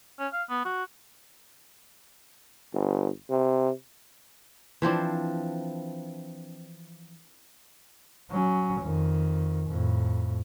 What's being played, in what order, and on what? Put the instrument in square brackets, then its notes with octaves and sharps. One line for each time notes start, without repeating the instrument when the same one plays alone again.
[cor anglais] C#4
F5
B3
F#4
[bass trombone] G1
C3
[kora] E3 F3 C4 D4
[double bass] F#3 C#4
F2 D#3
F2 A2